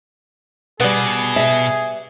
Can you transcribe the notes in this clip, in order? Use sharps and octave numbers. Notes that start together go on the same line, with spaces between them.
B2 G3 B3 G#4
E5